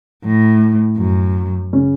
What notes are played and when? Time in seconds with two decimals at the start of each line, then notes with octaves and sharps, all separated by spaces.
0.24 A2
0.98 F#2
1.73 C#3 C#4